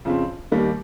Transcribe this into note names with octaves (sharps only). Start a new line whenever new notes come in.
F2 C#3 F3 C4
D#2 D#3 G3 A#3